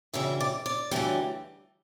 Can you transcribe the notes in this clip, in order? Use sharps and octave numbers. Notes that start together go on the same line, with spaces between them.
D2 C#3 E3 G3 E5
D5
D5
D2 C#3 E3 G3